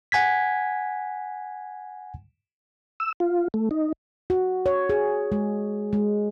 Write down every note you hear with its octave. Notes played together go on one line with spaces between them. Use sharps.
F#5 G#5 G#6 B6
E6
F4
A3
D#4
F#4
C#5
G#4
G#3
G#3